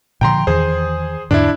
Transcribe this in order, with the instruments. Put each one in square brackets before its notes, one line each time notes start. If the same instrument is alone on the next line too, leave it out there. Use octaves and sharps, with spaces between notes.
[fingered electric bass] A#2 D3 F3 [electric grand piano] G5 A#5 C6
[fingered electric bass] E2 D#3 E3 [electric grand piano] G#4 C5
[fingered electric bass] E2 G#2 D3 [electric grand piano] D4 E4